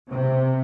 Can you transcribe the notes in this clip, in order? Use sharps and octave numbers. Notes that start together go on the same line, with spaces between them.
C3